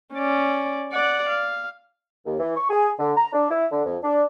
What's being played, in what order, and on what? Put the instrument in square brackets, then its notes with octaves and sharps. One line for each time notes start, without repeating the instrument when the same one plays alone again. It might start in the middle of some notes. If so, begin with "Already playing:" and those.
[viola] C#4 D5
D5 F#5
F5
[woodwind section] D#2
E3
C#6
G#4
D3
A#5
D4
E4
D3
F2
D4